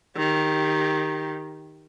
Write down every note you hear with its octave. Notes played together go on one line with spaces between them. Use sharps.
D#3 G4